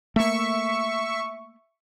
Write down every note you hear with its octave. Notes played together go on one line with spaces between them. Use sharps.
A3 A#3 E5 C#6